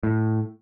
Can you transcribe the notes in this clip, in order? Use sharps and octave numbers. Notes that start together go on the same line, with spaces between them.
A2